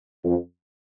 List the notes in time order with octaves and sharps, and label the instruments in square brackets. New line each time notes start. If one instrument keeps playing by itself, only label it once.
[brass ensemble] F2